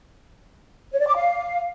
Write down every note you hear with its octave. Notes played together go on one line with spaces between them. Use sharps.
C#5
D5
D6
F5